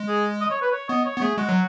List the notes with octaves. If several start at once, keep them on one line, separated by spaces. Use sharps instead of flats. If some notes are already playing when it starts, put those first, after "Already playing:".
Already playing: G#3
G#4
D#5
C#5
B4
C#5
B3 D#5
C#5
B3
A3 G#4
G#3 F#4
F#3